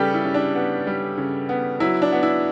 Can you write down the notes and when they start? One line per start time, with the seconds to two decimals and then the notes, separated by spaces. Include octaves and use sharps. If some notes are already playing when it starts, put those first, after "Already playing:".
Already playing: C#3 G3 G4 A4 B4
0.14 E4
0.24 C#3
0.34 D4
0.55 B3
0.87 G3
1.18 C#3
1.49 B3
1.80 F#3 E4
2.02 D4
2.12 B3
2.23 E4